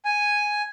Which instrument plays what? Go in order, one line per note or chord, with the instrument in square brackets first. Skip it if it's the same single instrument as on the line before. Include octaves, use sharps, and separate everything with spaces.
[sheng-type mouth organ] G#5